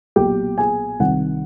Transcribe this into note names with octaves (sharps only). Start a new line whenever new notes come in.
B1 A#2 G4 G5
G#4 G#5
C2 C3 D#3 F#5